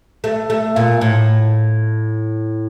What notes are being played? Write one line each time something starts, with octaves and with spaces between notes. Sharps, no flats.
A3
A3
A#2
A2